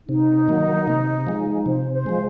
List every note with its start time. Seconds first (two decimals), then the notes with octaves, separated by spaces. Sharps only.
0.08 C3 D#4
0.48 D#3 F#3 A#3
0.88 C3
1.27 F3 G#3
1.66 C3 C5
1.93 C5
2.06 F3 G#3